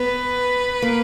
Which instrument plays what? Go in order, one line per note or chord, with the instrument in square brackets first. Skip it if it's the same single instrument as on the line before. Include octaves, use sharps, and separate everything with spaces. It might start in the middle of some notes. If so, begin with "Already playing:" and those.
Already playing: [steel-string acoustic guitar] B3 [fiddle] B4
[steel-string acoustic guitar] A#3